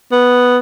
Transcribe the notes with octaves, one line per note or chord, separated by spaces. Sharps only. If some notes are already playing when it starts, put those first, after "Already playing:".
B3